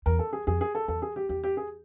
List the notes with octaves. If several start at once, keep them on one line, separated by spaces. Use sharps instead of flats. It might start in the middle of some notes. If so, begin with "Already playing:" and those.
E2 A#4
A4
G#4
F2 G#4
G#4
A4
E2 A4
G#4
G4
E2 G4
G4
G#4